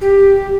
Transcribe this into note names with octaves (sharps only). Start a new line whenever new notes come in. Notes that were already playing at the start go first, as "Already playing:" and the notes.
G4